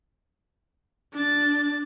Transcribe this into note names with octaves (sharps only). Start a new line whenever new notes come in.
D4 A6